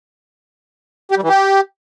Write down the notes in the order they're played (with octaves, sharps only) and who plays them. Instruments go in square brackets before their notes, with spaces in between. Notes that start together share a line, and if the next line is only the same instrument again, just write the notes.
[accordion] G4
G3
E3
G4